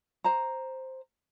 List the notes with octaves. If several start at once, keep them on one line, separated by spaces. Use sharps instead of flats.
C5 A#5